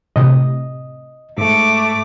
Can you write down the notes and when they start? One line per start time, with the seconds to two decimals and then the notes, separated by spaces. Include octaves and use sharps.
0.16 A2 C3 D#5
1.38 G#2 A3 D6